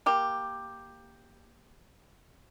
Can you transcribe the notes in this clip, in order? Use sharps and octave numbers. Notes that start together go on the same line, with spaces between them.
A#3 G4